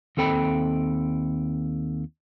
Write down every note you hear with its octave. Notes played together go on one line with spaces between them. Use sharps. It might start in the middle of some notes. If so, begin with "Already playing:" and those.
D#2 C4 A4 G5 B5